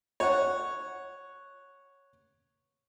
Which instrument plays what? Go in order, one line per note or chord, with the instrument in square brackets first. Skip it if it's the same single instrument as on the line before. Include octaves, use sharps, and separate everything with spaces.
[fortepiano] C#5 F#5